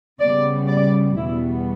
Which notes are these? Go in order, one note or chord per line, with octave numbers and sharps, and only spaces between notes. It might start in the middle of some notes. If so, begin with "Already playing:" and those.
C#3 G3 B3 D5
D5
E2 B2 G3 B3 E4